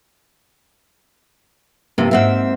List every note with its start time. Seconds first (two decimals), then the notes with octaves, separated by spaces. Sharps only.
1.98 G2 C3 F3 A#3 E4 F4
2.11 G#2 A#3 C4 E5 F#5 F6